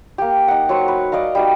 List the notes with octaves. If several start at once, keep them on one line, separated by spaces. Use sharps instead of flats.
A#3 G4
D#4 F#5
F#3 C5 C#6
B4
D5 D#5 F5 A#5
G3 D#4 F#4